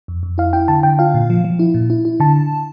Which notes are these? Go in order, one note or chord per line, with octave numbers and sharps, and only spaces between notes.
F2
F2
E4 F5
E4 G5
D3 A5
D3 G5
F4 F5
A#2
F3
F3
E4
A#2
E4
E4
D3 A5